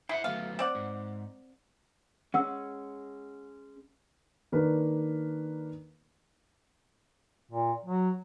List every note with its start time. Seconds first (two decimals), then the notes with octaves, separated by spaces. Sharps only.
0.09 E4 C5 D#5 F#5
0.24 F#3 A3 B3 F5
0.59 C4 D5 F#5
0.75 G#2
2.34 G#3 C#4 F#5 E6
4.52 D#3 A#3 D4 A#4 B4
7.51 A#2
7.85 F#3